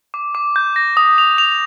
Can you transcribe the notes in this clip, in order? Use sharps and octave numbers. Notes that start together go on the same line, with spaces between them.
D6
D6
G6
A#6
D#6
F7
F7